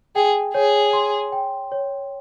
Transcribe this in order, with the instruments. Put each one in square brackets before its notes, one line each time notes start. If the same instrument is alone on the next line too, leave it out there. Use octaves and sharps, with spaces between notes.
[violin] G#4 [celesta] G5
[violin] G#4 [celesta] C#5
[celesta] C6
G5
C#5